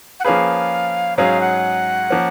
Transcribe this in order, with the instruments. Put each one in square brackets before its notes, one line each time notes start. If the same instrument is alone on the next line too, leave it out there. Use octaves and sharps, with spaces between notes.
[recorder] F#5
[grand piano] F3 A#3 C#4 G#4 B4 [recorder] F5
[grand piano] G#2 F#3 C#4 G#4 [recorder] F5
[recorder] F#5
[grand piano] F3 A#3 C#4